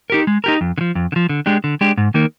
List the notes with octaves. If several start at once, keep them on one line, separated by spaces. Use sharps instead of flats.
D#4 G4 A#4
G#3
D#4 G4 A#4
F2
D3
F3
F2
D3
F3
D3
G#3 D4 G4
D3
G#3 D4 G4
G#2
D#3 A#3 D#4 A#4